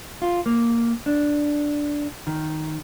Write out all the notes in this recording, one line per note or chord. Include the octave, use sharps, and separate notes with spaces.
F4
A#3
D4
D#3